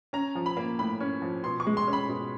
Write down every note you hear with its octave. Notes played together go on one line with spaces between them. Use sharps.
C#4 A#5
F3
B5
A#3
A2 B5
C#4
F3
B2 C6
C#6
G#3
C6
C#4
B5
B2